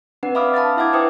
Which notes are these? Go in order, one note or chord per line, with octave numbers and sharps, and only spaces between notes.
C4 D4 B4 F#5
E5 F5 B5 D6 D#6 F6
A5 B5 F6 A6
E4 E5 F#5 D6 G#6
B4 C5 E5 G5 D#6